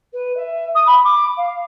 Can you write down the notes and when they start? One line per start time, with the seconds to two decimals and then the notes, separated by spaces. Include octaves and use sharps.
0.13 B4
0.36 E5
0.75 D#6
0.86 B5
1.04 D6
1.37 F5